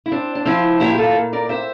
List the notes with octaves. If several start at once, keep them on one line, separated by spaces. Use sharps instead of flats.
E4
C4 D4
D4
F3 C4 E4
A#2 E4 G4
F4 A4
A#2
A#4 D5
C4 C5 E5